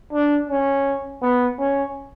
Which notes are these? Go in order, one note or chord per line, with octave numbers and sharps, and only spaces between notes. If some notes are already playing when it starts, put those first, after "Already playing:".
D4
C#4
B3
C#4